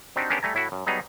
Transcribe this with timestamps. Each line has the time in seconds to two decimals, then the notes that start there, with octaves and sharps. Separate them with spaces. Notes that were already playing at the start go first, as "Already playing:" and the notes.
0.16 C4 D4 D#4 F#4 G4
0.30 B3 C#4 D4 G4 G#4 A#4
0.43 G3 A3 G#5 A#5
0.54 A2 E4 F#4
0.72 F#2
0.86 F#3 G3 B3 D#4 G#4